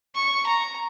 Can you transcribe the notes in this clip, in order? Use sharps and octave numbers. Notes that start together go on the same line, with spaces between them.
C#6
A#5